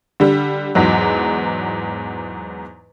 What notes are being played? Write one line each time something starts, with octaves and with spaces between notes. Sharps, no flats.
D3 G3
E2 G#2 F#3